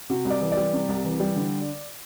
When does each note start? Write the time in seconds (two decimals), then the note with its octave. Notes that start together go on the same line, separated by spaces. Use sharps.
0.10 C3 F#4
0.25 C2
0.30 D5
0.41 E3
0.51 D5
0.57 G3
0.73 C3
0.89 C2
1.04 E3
1.20 G3
1.36 D3